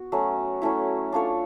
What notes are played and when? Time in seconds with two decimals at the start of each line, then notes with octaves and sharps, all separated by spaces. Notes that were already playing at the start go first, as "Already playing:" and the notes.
Already playing: B3 F#4
0.12 F#3 A3 C#4
0.62 F#3 A3 C#4 E4
1.12 D4 F4 A4 C#5